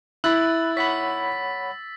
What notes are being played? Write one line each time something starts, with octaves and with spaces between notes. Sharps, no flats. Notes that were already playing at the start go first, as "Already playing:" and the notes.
E4 B5 E6 F#6 A6
C#5 F#5 B5 E6 B6